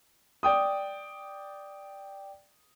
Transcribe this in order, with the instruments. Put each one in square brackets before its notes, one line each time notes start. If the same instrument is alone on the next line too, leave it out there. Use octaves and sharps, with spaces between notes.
[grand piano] D5 G5 D#6